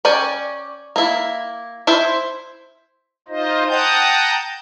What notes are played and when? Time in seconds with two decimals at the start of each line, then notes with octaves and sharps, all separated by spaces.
0.05 C#4 D5 G5 G#5
0.96 A#3 E4
1.87 E4 C5 E5
3.28 D#4 F4 C5 D#5
3.68 F#5 G5 A5 A#5 D#6 G6